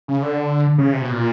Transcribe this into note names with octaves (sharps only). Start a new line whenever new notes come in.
C#3
D3
C#3
C3
B2
A#2